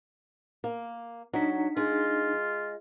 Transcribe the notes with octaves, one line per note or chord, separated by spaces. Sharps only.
A#3
F#3 D4 D#4 B6
G#3 F4